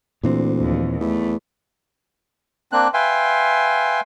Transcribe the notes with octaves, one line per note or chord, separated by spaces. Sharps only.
D2 A#2 E3 C4
D#2 F3
E2 A3
A#3 C4 D4 F#6
B4 E5 F5 G5 G#5 C6